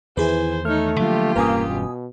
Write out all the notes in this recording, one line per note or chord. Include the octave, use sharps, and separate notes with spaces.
E2 D#3 E4 G#4 B4 C5 G#5
A3 D#4 C#5 F6
D3 F3 F#3 A#3 F4 G4
E1 G2 A#3 C#4 B4 G#5 D#6
B2